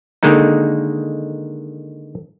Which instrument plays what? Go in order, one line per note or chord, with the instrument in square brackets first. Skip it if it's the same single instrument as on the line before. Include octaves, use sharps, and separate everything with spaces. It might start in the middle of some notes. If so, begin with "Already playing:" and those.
[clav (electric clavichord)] D3 D#3 G#3 A#3 D#4